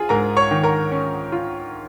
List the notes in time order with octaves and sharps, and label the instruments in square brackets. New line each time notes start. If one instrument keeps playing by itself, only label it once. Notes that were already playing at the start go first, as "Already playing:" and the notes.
Already playing: [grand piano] F4 G#4 G#5
G#2 A#4 A#5
C#5 C#6
D#3
A#4 A#5
C#4
F4